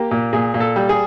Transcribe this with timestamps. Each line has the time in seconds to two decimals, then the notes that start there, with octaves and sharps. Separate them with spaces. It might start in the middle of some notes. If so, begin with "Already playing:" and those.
Already playing: A#3 G4
0.11 A#2
0.33 A#2 G#4
0.54 A#2
0.60 A4
0.76 G3
0.89 G#4